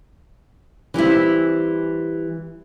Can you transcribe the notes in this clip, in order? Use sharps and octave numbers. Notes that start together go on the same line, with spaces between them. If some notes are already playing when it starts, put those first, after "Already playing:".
E3 G3 C4 E4